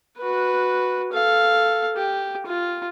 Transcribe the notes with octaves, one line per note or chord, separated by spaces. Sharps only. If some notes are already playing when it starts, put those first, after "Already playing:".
F#4 B4
A4 F5
G4
F4